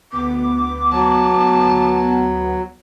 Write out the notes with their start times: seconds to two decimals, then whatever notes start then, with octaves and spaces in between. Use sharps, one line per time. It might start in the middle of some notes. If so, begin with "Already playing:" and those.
0.12 D2 B3 D6
0.92 F#3 A5